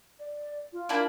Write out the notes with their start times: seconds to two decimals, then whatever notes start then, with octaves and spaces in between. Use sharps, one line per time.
0.19 D5
0.73 F4
0.89 A#3 D4 E4